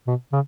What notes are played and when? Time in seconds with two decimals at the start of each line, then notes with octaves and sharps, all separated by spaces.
0.07 B2
0.32 C#3